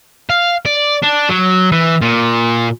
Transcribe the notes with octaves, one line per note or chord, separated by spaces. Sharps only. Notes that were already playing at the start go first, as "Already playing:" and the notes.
F5
D5
D4
F#3
E3
A#2